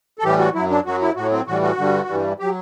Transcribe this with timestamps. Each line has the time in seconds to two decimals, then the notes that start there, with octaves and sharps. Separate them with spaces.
0.19 A4
0.24 A2 E3 G3 G4
0.39 F#4
0.54 F#2 F#3 E4
0.70 D4
0.85 F#2 F#3 F#4
1.01 E4
1.16 A2 F#3 F#4
1.32 C4
1.47 A2 E3 G3 F#4
1.62 F#4
1.78 G2 D3 G3
2.08 G2 E3 G3
2.39 F#3 G4